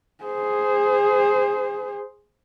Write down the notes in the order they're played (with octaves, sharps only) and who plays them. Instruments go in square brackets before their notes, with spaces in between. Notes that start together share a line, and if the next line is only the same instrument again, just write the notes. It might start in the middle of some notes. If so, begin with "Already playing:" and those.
[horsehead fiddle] G#4 C5